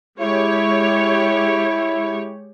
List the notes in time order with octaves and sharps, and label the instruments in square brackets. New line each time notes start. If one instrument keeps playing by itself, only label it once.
[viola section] G#3 G4 C#5 [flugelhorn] E4